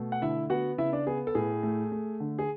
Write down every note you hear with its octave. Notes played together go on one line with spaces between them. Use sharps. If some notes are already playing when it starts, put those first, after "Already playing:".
Already playing: B2 A3
F#5
D3 E4 E5
B3 F#4 F#5
C#3 E4 E5
D4 D5
B3 G#4
A4
A2 G#4
A3
A3
D3
G#4